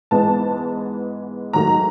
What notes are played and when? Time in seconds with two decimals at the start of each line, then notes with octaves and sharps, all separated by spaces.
0.11 G#2 E3 G#3 B3 A5
1.53 G#2 D#3 F#3 A3 A#5